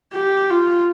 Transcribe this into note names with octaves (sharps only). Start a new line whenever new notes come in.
G4
F4